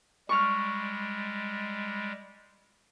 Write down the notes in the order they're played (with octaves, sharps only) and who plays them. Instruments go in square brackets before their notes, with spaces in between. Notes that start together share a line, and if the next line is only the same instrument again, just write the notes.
[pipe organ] G3 G#3 [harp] C#6 F6